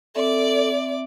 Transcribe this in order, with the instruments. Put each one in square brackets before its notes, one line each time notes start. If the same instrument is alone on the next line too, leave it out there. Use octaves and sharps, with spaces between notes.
[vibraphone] C4 E5 [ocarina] A4 [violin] D5 D6